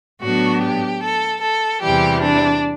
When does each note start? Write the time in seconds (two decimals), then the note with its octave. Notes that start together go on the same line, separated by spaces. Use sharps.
0.22 A2 F#3 B3 D4 F#4
0.62 G4
1.02 A4
1.42 A4
1.82 E2 C3 E3 G3 G4
2.22 D4